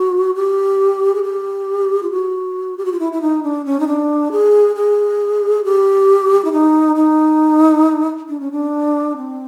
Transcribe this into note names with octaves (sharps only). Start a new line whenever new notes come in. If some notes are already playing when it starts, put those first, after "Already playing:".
Already playing: F#4
G4
G#4
G4
F4
F#4
G4
F#4
F4
E4
E4
D#4
D4
C#4
D#4
D4
G#4
G#4
G4
E4
D#4
D#4
D4
C#4
D4
C4